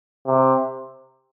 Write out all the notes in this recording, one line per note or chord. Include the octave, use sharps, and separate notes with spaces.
C3